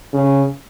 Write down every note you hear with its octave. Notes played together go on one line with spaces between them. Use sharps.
C#3